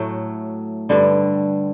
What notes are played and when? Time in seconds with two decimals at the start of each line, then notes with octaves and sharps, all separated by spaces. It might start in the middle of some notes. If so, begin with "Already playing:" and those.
Already playing: A2 F#3 A3
0.89 G2 D3 G3